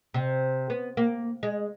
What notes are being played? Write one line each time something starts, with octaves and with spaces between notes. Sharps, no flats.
C3
B3
A#3
G#3